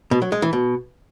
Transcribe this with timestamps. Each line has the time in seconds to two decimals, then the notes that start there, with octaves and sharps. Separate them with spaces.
0.11 B2
0.22 F#3
0.32 G#3
0.42 E3
0.53 B2